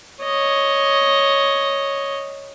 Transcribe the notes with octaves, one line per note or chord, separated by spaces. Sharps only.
C#5 D#5